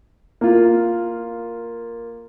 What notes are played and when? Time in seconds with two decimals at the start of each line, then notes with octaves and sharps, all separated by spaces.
0.41 A#3 F4